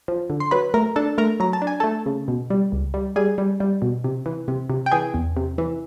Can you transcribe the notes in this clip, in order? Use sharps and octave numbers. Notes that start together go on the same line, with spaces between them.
F3
D3
C6
F#3 B4 B5
A3 A#4 A#5
D4 A4 A5
A3 A#4 A#5
F#3 A#5
A5
D4
G#5
A3 A4 A5
C#3
B2
G3
C#2
G3
G3 G#4 G#5
G3
G3
B2
C3
E3
C3
C3
G5
E3 G#4 G#5
E2
C3
E3